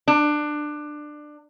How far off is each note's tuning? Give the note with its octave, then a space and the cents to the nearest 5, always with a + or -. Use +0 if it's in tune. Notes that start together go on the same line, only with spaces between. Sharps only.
D4 +20